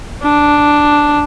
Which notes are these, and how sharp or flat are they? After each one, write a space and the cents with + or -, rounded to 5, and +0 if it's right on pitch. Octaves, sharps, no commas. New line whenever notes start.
D4 +0